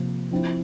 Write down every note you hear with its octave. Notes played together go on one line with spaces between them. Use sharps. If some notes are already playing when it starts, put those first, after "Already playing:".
Already playing: C3 F3 A#3
F3 C4 E4